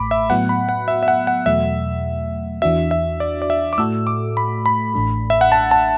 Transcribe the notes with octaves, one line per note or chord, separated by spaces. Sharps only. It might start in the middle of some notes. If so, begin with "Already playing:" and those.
Already playing: A1 A2 A3 B5 D6
E5
A2 F#3 B3 F#4 F#5
B5
F#5
E5
E5
F#5
F#5
E2 B2 F#3 A3 E5
E2 E3 D4 F#4 E5
E5
D5
D5
E5
D6
A2 A3 F#4 A4 E6
D6
B5
B5
A1 A2 A3 D4 A4
E5
F#5
A5
A5